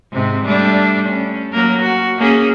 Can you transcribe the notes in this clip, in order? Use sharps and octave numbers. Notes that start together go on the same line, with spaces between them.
G#2 C3 C4
G3 A3 D4
C#4
F#3 A#3 A#4
F#4
A#3 C#4 G#4